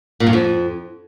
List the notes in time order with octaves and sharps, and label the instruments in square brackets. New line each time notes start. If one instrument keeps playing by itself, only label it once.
[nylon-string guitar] A#2
G2
F2